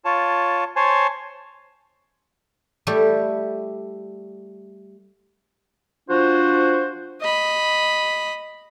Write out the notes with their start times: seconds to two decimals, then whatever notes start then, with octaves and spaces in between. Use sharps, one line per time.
0.05 F4 C#5 A5
0.76 C5 C#5 G#5 A5
2.87 G3 A3 E4 G4
6.10 F3 D4 F4 F#4 C5
7.20 D#5 B5